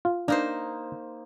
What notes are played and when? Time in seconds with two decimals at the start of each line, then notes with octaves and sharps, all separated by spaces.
0.05 F4
0.28 A#3 D4 D#4 C5